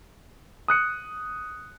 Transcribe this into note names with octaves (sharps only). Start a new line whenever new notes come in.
D#6 F#6 C#7